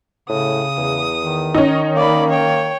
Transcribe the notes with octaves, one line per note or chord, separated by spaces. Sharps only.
A2 C#3 D#6
E2
D#3
C#4 D#4
A#3 D5 B5
C#5 G5